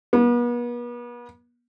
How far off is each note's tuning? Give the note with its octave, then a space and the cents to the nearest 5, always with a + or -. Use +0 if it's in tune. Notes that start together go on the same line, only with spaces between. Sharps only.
B3 -40